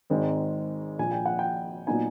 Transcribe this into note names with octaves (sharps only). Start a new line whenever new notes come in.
G#1 G#2 D#3 G#3 C4
A#1 A#2 F3 G#5
G5
F#5
G5
A#2 F#3 B3 D#4 G#5